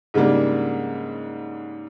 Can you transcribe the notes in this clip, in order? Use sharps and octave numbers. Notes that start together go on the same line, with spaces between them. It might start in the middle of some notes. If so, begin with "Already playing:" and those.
G#2 C#3 G3 A#3 D4